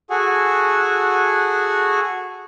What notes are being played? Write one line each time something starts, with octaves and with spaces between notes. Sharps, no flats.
F#4 G#4 A4 F#5 G#5